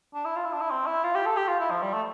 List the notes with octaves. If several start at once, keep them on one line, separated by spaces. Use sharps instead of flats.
D4
E4
F4
E4
D4
E4
C4
E4
F4
G4
A4
G4
F4
E4
F3
G3
A3